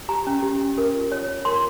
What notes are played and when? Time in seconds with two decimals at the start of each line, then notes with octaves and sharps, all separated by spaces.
0.09 G4 A#5
0.27 C#4
0.43 G4
0.61 C#4
0.78 A#4
0.94 F4
1.12 C#5
1.28 F4
1.45 A#4 C6